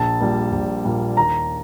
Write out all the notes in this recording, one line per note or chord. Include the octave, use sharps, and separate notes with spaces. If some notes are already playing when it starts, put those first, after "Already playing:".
Already playing: A#1 A5
A#2 G3 A#3
A#1
A#2 G3 A#3
D#2 A#5